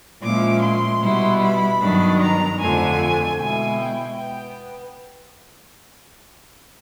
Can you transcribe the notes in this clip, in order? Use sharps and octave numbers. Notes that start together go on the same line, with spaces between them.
A#2 F3 G#3 C#4 E4 D6
C6
B2 G3 B3 E4
B5
G2 D#3 F#3 B3 D4
A#5
F2 D3 F3 A3 D4 G#5
B2 G#3 B3 E4 G#5
G5
B3 G5